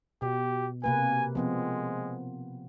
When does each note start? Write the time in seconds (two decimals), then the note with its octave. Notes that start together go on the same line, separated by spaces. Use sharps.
0.22 B2 G4
0.84 C3 A#3 B4 G#5
1.35 F3 G#3 B3 C4